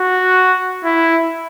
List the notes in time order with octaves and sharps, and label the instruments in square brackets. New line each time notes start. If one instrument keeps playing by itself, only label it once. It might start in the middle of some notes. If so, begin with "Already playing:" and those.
Already playing: [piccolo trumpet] F#4
E4